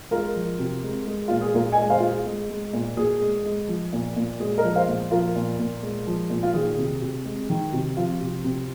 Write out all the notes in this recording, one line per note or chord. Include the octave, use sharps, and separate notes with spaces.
G#3 F4 A#4
F3
C3
G#3
G#3
A#2 F4
G#4
A#2 F4 A#4
D#5 G#5
G#3
C5 F5
G#3 F4
G#4
G#3
G#3
A#2
A#2 G#4
G#3
G#3
F3
A#2
A#2
G#3 G#4
A#4 D#5
F3
C5 F5
A#2
F3 F4 A#4
A#2
A#2
G#3
F3
A#2
F4
D#3 G#4
C3
C3
G#3
D#3
C3
F3 F4
C3
C3